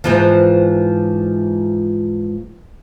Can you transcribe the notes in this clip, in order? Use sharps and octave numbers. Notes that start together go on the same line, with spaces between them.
G#2 E3 F3